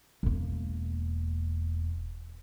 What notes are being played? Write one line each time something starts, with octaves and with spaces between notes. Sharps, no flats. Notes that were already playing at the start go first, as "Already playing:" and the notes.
E1 A#3